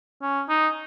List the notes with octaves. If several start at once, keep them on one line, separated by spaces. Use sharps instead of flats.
C#4
D#4